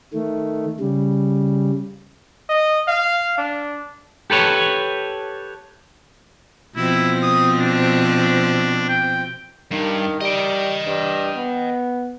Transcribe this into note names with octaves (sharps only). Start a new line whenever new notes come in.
D#3 A3
C#3 G3
D#5
F5
D4
G4 A4 B4 C#5
B2 F3 C4 E4
D#6
D4
G5
G2 D#3
G3 D#5 G5
G2
B3